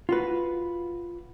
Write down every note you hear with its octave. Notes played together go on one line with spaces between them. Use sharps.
F4 F#4 B4